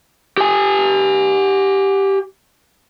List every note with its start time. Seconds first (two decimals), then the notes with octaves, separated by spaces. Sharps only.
0.37 G4 G#5